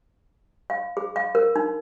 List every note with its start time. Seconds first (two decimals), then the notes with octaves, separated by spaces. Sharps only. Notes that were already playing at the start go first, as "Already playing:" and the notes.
0.70 F5
0.97 G#4
1.16 F5
1.35 A#4
1.56 D#4